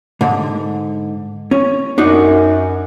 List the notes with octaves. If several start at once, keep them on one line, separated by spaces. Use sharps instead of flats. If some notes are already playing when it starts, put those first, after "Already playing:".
G#2 D3
C#4
F#2 D4 D#4 F#4